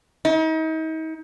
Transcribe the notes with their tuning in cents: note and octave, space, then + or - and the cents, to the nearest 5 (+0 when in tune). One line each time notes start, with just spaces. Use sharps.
D#4 +40